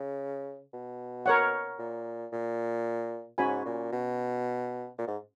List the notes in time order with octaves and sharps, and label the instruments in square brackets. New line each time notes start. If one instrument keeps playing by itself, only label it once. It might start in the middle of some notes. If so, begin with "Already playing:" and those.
Already playing: [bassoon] C#3
B2
[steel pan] A#4 C#5 F#5
[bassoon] A#2
A#2
[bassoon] G#2 [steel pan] C#4 F#4 C#5 G#5 B5
[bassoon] A#2
B2
A#2
G#2